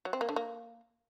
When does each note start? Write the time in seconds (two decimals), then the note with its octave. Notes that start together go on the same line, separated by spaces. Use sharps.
0.05 F#3
0.13 C4
0.21 A#3
0.29 D3
0.36 A#3